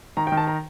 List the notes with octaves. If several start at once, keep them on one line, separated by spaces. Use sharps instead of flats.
D#3 A#5
G5
D#3
A5
A#5